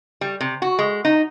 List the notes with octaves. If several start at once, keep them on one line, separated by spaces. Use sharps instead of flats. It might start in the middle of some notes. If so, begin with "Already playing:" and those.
G3
C3
F#4
G#3
D#4